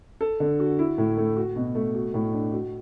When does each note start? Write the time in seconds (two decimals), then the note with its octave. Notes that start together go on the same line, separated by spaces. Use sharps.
0.21 A4
0.40 D3
0.60 F#4
0.79 E4
0.98 A2
1.17 A3
1.37 F#4
1.56 B2
1.75 A3
1.95 F#4
2.14 A2
2.34 D4
2.53 F#4